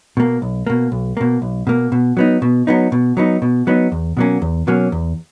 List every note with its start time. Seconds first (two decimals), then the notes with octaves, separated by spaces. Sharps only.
0.17 B2 A#3
0.42 B1
0.67 B2 A#3
0.92 B1
1.17 B2 A#3
1.42 B1
1.67 B2 A#3
1.92 B2
2.17 F#3 B3 D#4
2.42 B2
2.67 F#3 B3 D#4
2.92 B2
3.17 F#3 B3 D#4
3.42 B2
3.67 F#3 B3 D#4
3.92 E2
4.17 B2 F#3 A#3 C#4
4.42 E2
4.67 B2 F#3 A#3 C#4
4.92 E2